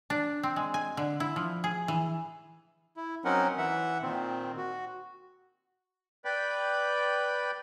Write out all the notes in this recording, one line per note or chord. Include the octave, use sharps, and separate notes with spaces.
D4
C4
G#3
G#5
D3
E4
F3
G#4
E3
E4
F#3 C4 C#4 D#4 A#4 F#5
E3 E5 F#5
A#2 D#3 C4
F#4
B4 D5 G5 B5